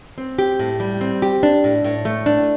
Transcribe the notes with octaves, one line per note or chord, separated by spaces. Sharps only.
C4
G4
A2
G3
C4
G4
D4
A2
A2
A3
D4